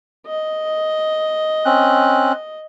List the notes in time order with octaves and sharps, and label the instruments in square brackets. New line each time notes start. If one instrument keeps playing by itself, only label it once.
[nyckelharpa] D#5
[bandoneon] C4 C#4 F#6